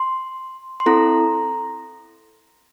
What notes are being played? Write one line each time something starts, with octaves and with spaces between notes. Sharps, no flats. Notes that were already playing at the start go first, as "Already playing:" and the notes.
Already playing: C6
C6
C4 E4 A4 A#5